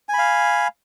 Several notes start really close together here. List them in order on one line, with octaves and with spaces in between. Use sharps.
G#5 B5 F5